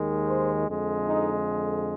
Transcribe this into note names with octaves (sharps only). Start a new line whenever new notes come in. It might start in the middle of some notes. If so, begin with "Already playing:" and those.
Already playing: D#2 D#3 G#3
C5
F2 D3 G#3
D#4